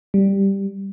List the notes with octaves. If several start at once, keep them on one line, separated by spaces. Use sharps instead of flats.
G3